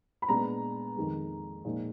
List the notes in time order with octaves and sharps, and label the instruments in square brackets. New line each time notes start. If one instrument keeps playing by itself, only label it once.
[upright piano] B5
A#2 G#3 B3 D4 A#5
F2 D#3 G#3
A#2 F3 G#3 D#4